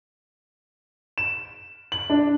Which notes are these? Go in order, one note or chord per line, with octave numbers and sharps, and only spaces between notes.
E7
F#7
D4